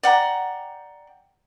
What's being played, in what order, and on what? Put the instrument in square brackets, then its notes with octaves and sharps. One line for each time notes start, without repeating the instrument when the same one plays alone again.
[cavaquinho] D5 F#5 G5 A#5